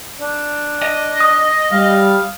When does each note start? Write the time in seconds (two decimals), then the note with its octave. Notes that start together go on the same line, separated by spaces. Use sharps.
0.21 D4
0.82 D#5
1.20 D#6
1.72 G3 F5